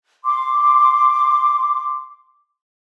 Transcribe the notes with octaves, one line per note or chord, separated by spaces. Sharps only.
C6 D6